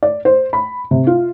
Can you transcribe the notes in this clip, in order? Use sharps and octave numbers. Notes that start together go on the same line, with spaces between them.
D5
C5
B5
C3
F4